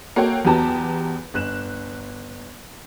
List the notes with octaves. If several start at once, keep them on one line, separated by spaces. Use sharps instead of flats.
A#3 F#4 A4 C#5 G5
E2 F#3 B3 G4 A5 A#5
G1 F#6 E7